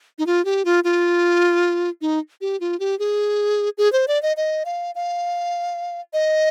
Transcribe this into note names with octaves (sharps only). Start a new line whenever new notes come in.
D#4
F4
G4
F4
F4
D#4
G4
F4
G4
G#4
G#4
C5
D5
D#5
D#5
F5
F5
D#5